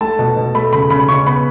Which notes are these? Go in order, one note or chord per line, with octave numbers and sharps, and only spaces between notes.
A3 A5
B2
B2
A3 B5
C#3 B5
C#3 B5
C#3 C#6
B3 B5